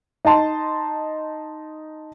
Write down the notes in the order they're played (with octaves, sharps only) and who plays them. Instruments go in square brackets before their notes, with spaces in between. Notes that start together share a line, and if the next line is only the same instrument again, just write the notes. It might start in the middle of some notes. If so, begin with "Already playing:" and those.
[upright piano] D#4 D#5 A5 C6